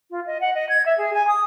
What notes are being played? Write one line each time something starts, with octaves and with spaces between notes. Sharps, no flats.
F4
D#5
F#5
D#5
G#6
E5
G#4
G#5
D#6